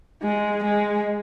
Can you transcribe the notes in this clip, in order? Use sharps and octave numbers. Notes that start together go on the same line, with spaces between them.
G#3
G#3